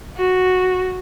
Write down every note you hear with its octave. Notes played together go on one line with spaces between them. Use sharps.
F#4